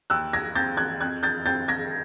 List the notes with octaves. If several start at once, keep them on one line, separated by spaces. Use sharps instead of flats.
D#2 E6 F#6
G#6 A#6
C4 G6 A6
F#6 G#6
F2 F#6 G#6
G6 A6
C4 G6 A6
G#6 A#6